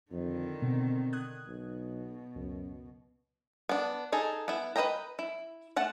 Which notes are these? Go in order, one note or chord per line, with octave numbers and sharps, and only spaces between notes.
F2 D3 D#3
B2 C4
D#6 F#6 G#6
B1 B2
C#2 F#2
B3 D4
D#4 G#4 A4
B3 E4
B4 C5 D#5 G5 A#5
E4
A3 F#5 A5